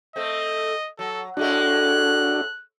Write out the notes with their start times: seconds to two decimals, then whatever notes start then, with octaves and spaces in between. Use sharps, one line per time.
0.16 A3 C4 D#5
0.99 F#3 A4
1.37 A2 G#3 A3 D4 F#4 F#6